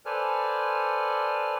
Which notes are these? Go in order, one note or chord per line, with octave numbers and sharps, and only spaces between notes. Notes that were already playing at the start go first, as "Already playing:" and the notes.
A4 B4 C5 D5 G#5 F6